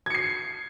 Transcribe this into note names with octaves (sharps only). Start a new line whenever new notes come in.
G#6 C7 C#7